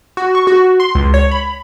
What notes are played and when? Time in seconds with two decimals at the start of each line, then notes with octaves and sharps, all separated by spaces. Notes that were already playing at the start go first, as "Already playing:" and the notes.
0.17 F#4
0.35 C#6
0.47 F#4
0.80 C6
0.95 C#2
1.14 C#5
1.31 B5